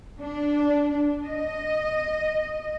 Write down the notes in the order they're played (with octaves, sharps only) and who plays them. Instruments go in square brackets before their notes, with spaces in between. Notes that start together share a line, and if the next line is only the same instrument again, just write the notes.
[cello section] D4
D#5